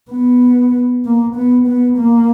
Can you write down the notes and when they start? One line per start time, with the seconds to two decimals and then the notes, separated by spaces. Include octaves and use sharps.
0.11 B3
1.05 A#3
1.36 B3
1.67 B3
1.98 A#3